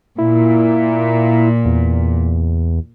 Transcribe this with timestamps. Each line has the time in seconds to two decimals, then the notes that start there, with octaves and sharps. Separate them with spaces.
0.18 A#2 E4
1.66 E2